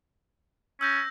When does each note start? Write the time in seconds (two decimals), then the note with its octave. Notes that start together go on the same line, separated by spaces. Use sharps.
0.81 C#4 E6 G6 A#6